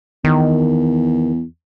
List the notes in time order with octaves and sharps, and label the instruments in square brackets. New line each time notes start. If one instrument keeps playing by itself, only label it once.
[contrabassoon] E2 [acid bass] D#3